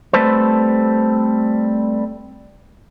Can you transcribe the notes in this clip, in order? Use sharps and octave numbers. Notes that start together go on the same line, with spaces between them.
G3 A3 C4 A4 B4 C5